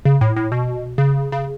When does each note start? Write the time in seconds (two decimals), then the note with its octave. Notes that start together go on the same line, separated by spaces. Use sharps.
0.05 C#3
0.21 A2
0.36 A2
0.52 B2
0.98 C#3
1.32 C#3